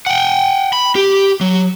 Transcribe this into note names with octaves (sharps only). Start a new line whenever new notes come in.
F#5 G5
B5
G4
F#3